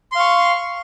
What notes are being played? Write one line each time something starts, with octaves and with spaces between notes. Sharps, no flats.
F5 C6 C#6